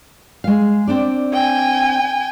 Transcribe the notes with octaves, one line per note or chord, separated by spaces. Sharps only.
G#3 F5
C4 D4 D5
G5 G#5